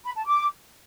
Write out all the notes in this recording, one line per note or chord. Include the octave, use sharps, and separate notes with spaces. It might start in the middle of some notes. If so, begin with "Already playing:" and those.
B5
A5
D6